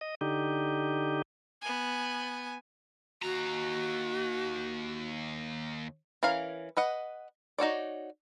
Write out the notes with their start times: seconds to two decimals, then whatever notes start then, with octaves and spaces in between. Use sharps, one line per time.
0.01 D#5
0.21 D3 D#4 G4
1.61 B3 G#5
3.23 D#2 F#4 A#5
6.23 E3 C#4 A#4 F5
6.77 B4 D#5 F#5
7.58 D#4 F#4 C#5 D5